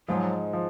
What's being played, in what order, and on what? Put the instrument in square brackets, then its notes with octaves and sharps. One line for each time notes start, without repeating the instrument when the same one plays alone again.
[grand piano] G#2 F3 G#3 [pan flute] F#3
[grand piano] F3